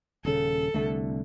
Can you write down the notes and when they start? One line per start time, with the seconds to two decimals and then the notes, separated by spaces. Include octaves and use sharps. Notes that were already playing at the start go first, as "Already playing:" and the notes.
0.25 D#1 C#3 A4
0.74 C2 D3 A3